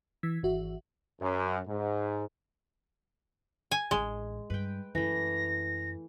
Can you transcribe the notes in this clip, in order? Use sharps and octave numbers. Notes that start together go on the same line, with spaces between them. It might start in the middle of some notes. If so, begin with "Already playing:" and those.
E3 E6 G#6 B6
G#1 E3 F#4 E5
F#2
G#2
G#5
A1 G#3 D4
G2 B4 G5
F#2 E3 A3 A#6